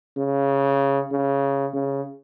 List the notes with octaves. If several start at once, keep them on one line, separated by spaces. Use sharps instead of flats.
C#3
C#3
C#3